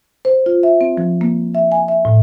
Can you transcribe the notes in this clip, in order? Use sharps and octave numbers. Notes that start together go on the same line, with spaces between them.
C5
F4
E5
C4
F3
A#3
E5
G#5
E5
A2